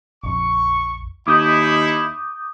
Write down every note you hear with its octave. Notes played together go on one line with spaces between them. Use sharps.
A#1 F2 C#6
D#2 D#4 E4 D6 D#6 G6